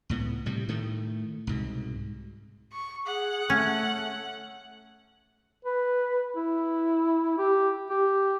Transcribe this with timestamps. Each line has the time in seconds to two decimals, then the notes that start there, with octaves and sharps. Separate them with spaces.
0.09 C#2 A2 B3
0.46 A2 C3 G3
0.69 A2 D#3 A3
1.47 C2 G#2 B2
2.73 C#6
3.06 G#4 F#5
3.50 A3 C#4
5.65 B4
6.36 E4
7.38 G4
7.90 G4